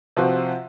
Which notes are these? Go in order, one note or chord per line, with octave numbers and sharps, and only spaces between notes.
C3 F3 C4 F#4 C5